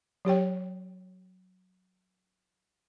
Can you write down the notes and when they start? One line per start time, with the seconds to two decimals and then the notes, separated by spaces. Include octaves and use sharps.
0.25 F#3 G4 C#5 G5